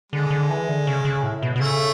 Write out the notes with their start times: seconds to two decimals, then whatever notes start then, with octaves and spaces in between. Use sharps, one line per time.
0.12 D3 G#3
0.30 D3
0.50 E3
0.68 D3
0.87 C#3
1.05 C#3
1.23 A2
1.42 B2
1.56 B2
1.60 C#3 A3